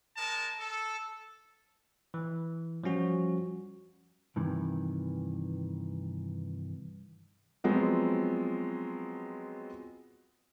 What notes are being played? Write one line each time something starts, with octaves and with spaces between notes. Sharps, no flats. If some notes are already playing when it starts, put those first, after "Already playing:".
G#3 A#4 A5
A4
E3
F3 G3 C#4 F#4
G2 C3 D#3 E3
F3 F#3 G#3 B3 C4